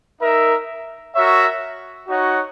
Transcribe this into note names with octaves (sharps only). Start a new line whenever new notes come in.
D#4 A#4 E5
F#4 A#4 C#5 E5
D#4 F#4 C#5 F#5